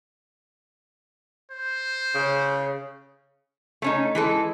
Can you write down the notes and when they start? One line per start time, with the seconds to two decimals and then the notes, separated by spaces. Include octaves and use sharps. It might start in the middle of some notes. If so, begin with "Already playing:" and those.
1.51 C5
2.15 C#3
3.82 A3 C#4 D#4
4.15 E3 G#3 A4